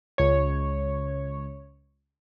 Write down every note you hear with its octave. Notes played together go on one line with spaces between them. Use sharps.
C#2 C#5